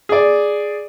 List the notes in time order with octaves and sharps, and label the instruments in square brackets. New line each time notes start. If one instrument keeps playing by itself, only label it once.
[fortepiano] G#4 D5